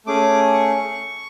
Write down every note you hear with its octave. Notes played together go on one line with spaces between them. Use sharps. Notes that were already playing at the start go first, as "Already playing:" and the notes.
A3 C#4 G#4 D6
C#6